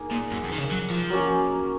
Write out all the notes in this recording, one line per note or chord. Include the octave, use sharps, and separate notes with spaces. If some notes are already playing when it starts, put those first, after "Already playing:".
Already playing: A#3 D#4 G#4
A#2
F#2
F2
D#3
C#3
F#3
F3
F#3 A#3 C#4